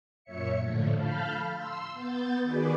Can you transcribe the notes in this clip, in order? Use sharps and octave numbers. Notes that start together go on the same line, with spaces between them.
F#2 A#2 C#5 E5 C#7
A2 D3 F3 A3
F5 A5 B5 F6 G6
C6 E6
B3 G6 A6
D#3 F#4 G#4 B4 D5